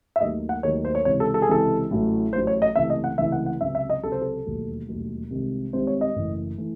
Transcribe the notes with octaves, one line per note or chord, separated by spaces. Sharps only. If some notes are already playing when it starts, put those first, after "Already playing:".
E5
D#2 D#3 F#3 A3 D#5
F#5
D#2 D#3 F#3 A3 C#5
C5
C#5
C#2 C3 E3 G#3 C#5
A4
A4
G#4
C#2 C3 E3 G#3 A4
A1 A2 F#3 A3
A1 A2 F#3 A3 C5
C#5
D#5
C#2 C3 E3 A3 E5
D#5
F#5
C#2 C3 E3 A3 E5
F#5
F#5
C#2 C3 F#3 E5
E5
D#5
C#2 C3 F#3 A4
C5
A4
E1 D#2 D#3 F#3 A3
E1 D#2 D#3 F#3 A3
C2 C3 D#3 G#3
C2 C3 D#3 G#3 C5
C#5
D#5
F#1 F#2 E3 A3
E3 A3